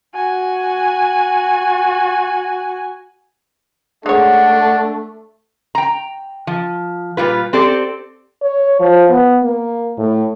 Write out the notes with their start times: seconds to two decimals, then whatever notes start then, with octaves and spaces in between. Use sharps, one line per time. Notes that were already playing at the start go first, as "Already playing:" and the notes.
0.15 F#4 G#5
4.06 G#3 A3 D4 C#5 F#5
5.75 G5 A#5
6.47 F3
7.17 A#2 D#3 G3 F4 B4
7.53 C4 G4 A4 D5
8.42 C#5
8.80 F3
9.09 B3
9.43 A#3
9.98 A2